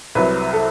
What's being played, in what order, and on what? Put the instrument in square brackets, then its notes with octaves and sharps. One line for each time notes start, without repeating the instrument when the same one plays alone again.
[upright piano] C2 C3 F#3 B4
A4